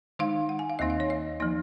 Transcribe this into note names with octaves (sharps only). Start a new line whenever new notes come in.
D#3 G#3 D#4 F5
F#5
G#5
F5
D#2 D#3 A#3 D#4 D#5
F5
C#5
D#5
F3 A#3 D#4